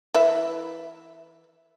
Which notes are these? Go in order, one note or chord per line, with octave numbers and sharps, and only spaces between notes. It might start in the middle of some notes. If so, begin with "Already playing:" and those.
E3 B4 E5